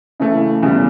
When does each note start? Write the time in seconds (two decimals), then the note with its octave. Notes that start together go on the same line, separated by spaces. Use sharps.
0.20 C#3 E3 A3
0.63 E2 C#3 G3